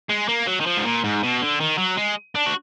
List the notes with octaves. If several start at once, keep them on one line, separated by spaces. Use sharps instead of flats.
G#3
A#3
F#3
D#3
F3
G#2
A#2
G#2
B2
D3
D#3
F#3
G#3
D4
F#4